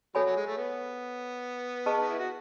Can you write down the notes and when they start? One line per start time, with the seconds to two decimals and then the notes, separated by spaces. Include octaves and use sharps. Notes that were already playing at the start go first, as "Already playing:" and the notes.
0.15 F#3 A4 C#5 G#5 B5
0.25 F#3
0.36 G#3
0.47 A3
0.58 B3
1.86 G#4 B4 D#5 A5 C#6
2.00 D#4
2.09 E4
2.19 F#4